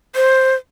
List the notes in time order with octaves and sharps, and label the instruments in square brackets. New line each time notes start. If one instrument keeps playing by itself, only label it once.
[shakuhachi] C5